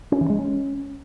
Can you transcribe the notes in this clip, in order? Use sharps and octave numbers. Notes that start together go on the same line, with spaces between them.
C#4
E3
G#3
C#4